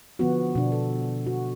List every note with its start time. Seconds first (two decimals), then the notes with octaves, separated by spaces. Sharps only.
0.19 D3 F3 B3 F#4
0.55 B2 D4
0.72 A4
1.26 F#4